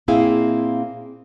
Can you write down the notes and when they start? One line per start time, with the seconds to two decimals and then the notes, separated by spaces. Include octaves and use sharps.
0.08 A#2 A#3 C4 E4 G#4 F5